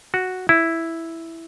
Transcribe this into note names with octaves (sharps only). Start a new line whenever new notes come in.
F#4
E4